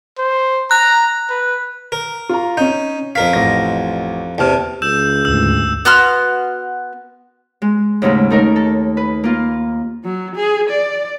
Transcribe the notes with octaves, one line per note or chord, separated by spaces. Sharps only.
C5
A#5 F#6
B4
A#4
F4 A#5
C#4 D#4 G6
F2 A#4 F5 B6
A1 A#6
E2 C3 G5 A5 F6
C#2 E6 G6 E7
D2 G#2 E6
B3 F#4 C6 F6
G#3
D#2 G#2 C#3 A3
A3 D#4 A#4
A4
B4
A#3 F4
F#3
G#4
D5